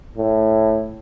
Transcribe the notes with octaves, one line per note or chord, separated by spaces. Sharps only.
A2